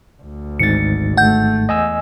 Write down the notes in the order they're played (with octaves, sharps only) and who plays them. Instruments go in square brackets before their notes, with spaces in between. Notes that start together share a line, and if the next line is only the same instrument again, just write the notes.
[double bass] D2
[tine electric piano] G#1 G#2 A6 [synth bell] C#7
[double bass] A3 [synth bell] F#5 G6
[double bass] E2 [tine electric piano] D#5 G#5 E6